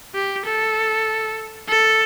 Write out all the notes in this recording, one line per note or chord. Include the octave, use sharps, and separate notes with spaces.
G4
A4
A4